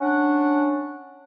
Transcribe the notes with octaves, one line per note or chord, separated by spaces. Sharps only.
C#4 D4 F#5